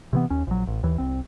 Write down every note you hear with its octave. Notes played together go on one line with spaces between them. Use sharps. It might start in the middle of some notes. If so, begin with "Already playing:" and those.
C3 E3 B3
D#2 C#4
A#1 F#3
A1
D#2 E3
C2 C4